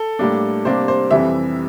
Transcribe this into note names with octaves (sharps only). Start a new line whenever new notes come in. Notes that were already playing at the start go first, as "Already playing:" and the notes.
Already playing: A4
A2 G3 A#3 D4
C3 G3 A#3 D4 C5
C5
F2 C3 E3 G3 E5